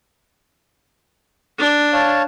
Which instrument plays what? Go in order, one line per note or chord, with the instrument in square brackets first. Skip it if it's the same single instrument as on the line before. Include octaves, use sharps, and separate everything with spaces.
[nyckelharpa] D4
[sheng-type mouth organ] C#5 F5 A5